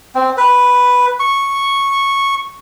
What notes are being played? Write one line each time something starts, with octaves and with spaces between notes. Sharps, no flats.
C4
B4
C#6